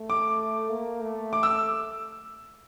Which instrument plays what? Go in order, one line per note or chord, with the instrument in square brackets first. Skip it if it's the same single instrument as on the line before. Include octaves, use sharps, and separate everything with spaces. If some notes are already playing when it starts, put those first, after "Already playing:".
Already playing: [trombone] A3
[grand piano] D6
[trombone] A#3
A3
[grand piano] D6
E6